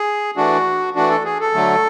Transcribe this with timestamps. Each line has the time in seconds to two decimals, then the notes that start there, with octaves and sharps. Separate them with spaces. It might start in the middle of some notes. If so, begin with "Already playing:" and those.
Already playing: G#4
0.37 E3 A3 D4 F#4
0.96 E3 A3 D4 F#4
1.10 A4
1.25 G#4
1.40 A4
1.54 D3 F#3 A3